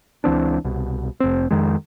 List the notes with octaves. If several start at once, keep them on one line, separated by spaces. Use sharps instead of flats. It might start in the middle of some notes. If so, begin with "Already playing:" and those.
C#2 E3 C4 D4
C2 B2
F1 C4
F2 D#3 G#3